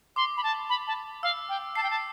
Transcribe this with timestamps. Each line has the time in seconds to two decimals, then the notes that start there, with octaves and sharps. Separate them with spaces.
0.16 C6 D6
0.37 B5
0.43 A5
0.69 B5
0.87 A5
1.23 F5 E6
1.49 G5
1.75 A5 C7
1.83 G5
1.90 A5